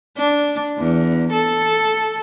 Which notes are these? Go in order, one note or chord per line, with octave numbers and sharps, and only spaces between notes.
D4
E2
A4